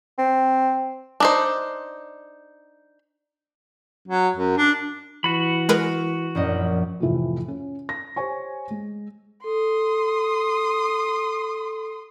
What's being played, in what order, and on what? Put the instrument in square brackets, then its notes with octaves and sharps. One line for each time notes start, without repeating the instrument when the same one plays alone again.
[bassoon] C4
[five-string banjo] D4 D#4 C5
[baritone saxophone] F#3
F#2
D4
[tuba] E3 [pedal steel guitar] F#4 B5
[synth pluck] G#3 A#4 B4
[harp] A#1 F#2 D#5
[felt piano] F2 A2 C3 E3 F3
C#4
A#6
G4 C5 C#5 G#5 C#6
G#3
[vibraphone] A4 [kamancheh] C6 D#6